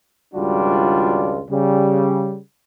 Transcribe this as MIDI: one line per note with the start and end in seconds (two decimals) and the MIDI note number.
0.34 1.40 32
0.34 1.40 37
0.34 1.40 55
0.34 1.40 62
0.34 1.40 65
0.34 1.40 66
1.50 2.38 49
1.50 2.38 55